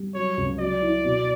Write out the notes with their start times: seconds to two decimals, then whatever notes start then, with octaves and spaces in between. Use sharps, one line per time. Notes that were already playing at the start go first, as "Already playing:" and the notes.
Already playing: G3
0.15 F#3 C#5
0.37 C#2
0.59 F#3 D5
0.82 E4
1.04 B2